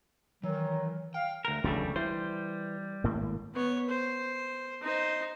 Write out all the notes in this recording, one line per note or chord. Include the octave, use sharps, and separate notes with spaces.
D#3 E3 F#3
F5 G5
D2 A#4
F1 D2 A#2 C#3 G3 A3
E3 G3 C5
G#1 A2 A#3
B3 C#5
C5
D#4 C5